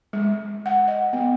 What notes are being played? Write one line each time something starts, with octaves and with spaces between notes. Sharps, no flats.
G#3
F#5
D#5
B3